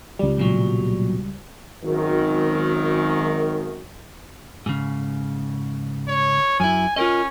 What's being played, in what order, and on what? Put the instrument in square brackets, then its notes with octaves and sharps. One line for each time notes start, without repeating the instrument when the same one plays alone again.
[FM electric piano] C#2 G3
[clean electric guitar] B1 A#2 F#3
[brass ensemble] G#1 F#2 D#3
[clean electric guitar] G#2 C#3
[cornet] C#5
[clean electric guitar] F#2 E4 [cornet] G#5
[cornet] C#4 [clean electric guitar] F4 A#4 D#5